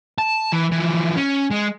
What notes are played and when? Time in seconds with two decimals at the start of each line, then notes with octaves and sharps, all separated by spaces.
0.18 A5
0.53 E3
0.72 E3 F3
1.17 C#4
1.52 G#3